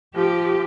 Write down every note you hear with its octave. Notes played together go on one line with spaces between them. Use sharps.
F3 G4